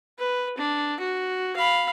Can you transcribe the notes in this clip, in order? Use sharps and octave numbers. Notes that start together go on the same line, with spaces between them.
B4
D4
F#4
F5 B5